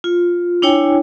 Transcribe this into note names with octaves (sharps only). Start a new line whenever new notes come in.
F4
D4 E4 C#5 G5 G#5